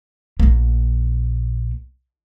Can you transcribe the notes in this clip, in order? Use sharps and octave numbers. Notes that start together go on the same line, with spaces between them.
A#1 A#3